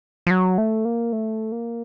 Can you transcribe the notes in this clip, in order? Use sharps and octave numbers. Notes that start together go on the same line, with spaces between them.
F3
F#3
A3
A#3
A3
A#3